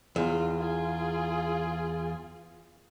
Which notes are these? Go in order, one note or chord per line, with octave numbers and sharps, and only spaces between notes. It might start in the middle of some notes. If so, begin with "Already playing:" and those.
E2 F4
F4 G#4